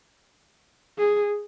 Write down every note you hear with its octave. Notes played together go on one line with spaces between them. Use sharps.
G#4